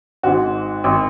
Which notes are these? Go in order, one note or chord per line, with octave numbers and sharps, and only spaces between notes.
G#1 G#2 F#4
G#1